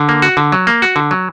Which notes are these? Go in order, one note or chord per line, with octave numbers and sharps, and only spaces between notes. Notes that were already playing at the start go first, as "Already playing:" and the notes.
Already playing: D3
A#3
F#4
D3
F#3
A#3
F#4
D3
F#3